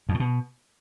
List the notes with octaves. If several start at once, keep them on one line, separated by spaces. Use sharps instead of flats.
F2
A2
B2